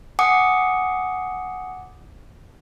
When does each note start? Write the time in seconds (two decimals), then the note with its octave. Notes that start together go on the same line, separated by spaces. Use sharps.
0.19 F#5 G#5 D6 D#6 C#7